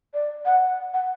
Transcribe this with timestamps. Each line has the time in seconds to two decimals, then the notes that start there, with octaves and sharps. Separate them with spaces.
0.14 D5
0.45 F#5
0.93 F#5